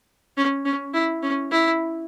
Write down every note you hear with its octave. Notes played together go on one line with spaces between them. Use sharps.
C#4
C#4
E4
C#4
E4